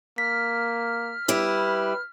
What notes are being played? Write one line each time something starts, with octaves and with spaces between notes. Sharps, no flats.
A#3 F6 B6
G3 E4 B4